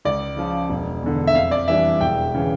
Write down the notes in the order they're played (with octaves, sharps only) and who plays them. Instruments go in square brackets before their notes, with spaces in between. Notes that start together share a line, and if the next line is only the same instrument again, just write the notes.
[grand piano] C#2 D5
C#3 F3
E1
E2 D3
E5
F2 F5
D5
E3 G3 D4 E5
E1 G5
C#3 E3